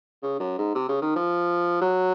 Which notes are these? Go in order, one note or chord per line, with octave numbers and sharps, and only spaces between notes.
C#3
F#2
G#2
C3
C#3
D#3
F3
F#3